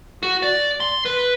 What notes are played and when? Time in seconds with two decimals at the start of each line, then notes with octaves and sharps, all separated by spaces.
0.23 F#4
0.42 D5
0.80 C6
1.06 B4